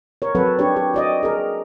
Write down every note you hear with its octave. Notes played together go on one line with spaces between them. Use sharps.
A#4 C#5
F#3 C4 A4 B4 F#5
D4 G4 C#5
G4
F#4 D5 D#5
G#4 A#4